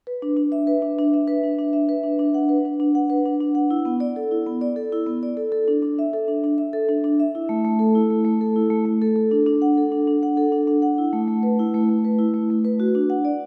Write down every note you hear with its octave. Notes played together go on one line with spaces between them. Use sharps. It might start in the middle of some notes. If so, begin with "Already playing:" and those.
B4
D4
D4
E5
B4
D4
D4
E5
B4
D4
D4
E5
B4
D4
D4
F#5
B4
D4
D4
F#5
B4
D4
D4
F#5
E4
B3
D5
A4
E4
B3
D5
A4
E4
B3
D5
A4
A4
D4
D4
E5
A4
D4
D4
E5
A4
D4
D4
E5
E4
A3
A3
A4
E4
A3
A3
A4
E4
A3
A3
A4
A4
D4
D4
F#5
A4
D4
D4
F#5
A4
D4
D4
F#5
E4
A3
A3
B4
E4
A3
A3
B4
E4
A3
A3
B4
F#4
D4
F#5
D5